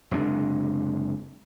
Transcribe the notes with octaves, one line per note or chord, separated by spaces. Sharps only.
F#1 C3 G#3 D4